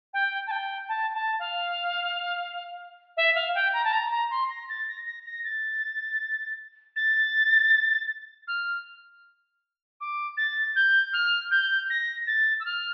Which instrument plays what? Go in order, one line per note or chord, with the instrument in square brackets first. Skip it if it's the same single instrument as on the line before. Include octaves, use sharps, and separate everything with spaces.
[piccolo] G5
A5
G5
A5
A5
F5
E5
F5
G5
A#5
A5
A#5
A#5
C6
A#6
A6
A#6
A#6
A#6
A6
A6
F6
D6
A6
G6
F6
G6
A#6
A6
E6
F6